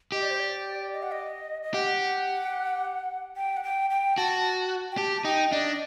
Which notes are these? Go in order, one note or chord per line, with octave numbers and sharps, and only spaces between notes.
G4 D#5
D5
C5
D5
D#5
F#5
D#5
D#5
G4 F#5
G5
F#5
G5
G5
F#4 A5
G5
G4 A5
A5
D#4 G5
D4 D#5